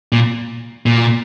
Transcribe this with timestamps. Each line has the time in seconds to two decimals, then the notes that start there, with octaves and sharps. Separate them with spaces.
0.12 A#2
0.86 A#2